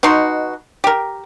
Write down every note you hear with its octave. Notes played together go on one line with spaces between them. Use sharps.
B2 D#4 F#4 C6
G4 A#4